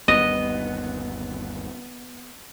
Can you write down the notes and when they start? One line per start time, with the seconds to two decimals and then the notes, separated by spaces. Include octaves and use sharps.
0.08 G1 D#2 G3 B3 D#5